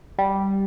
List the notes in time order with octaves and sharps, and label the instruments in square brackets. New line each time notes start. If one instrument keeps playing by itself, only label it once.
[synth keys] G3